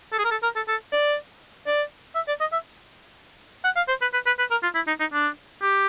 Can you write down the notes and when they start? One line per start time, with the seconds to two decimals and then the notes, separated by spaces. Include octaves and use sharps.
0.13 A4
0.19 G#4
0.25 A#4
0.31 A4
0.43 A#4
0.56 A4
0.68 A4
0.93 D5
1.67 D5
2.15 E5
2.28 D5
2.40 D#5
2.53 E5
3.64 F#5
3.76 F5
3.88 C5
4.02 B4
4.14 B4
4.27 B4
4.39 B4
4.51 A#4
4.63 F4
4.75 E4
4.87 D#4
5.00 D#4
5.13 D4
5.63 G4